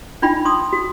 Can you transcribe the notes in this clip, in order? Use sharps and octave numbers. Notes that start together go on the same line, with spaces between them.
D4 D#4 F4 G5 B5
C6 D#6
F#4